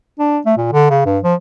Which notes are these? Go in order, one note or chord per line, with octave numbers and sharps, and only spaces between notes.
D4
A3
A#2
D3
C#3
G2
F3